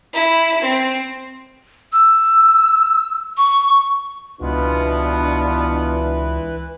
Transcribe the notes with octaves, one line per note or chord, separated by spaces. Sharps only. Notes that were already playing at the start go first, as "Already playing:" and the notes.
E4
C4
E6
C#6
C#2 B2 E3 B3 D4 E4 F4 B4